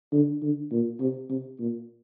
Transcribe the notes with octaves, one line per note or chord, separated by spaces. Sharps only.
D3
D3
A#2
C3
C3
A#2